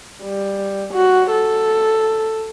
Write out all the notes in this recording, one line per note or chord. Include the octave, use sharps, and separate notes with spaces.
G3
F#4
A4